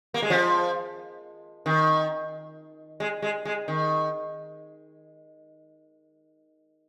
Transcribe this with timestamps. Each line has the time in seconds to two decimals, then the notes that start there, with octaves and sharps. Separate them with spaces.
0.14 A#3
0.22 G#3
0.30 F3
1.66 D#3
3.00 G#3
3.22 G#3
3.45 G#3
3.68 D#3